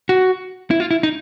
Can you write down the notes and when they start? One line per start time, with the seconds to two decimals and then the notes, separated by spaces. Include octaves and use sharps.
0.09 F#4
0.71 E4
0.80 F4
0.91 E4
1.03 D#4